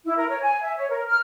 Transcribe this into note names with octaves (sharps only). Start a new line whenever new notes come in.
E4
A#4
C#5
G#5
E5
C#5
A#4
F6